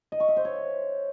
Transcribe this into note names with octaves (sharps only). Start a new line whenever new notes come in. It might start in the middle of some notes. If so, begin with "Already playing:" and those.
D#5
C#6
E5
C5
C#5